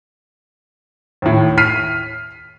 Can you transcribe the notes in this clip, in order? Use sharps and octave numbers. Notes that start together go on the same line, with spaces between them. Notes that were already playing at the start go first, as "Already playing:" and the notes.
D#2 A2
F6 B6 C7 D#7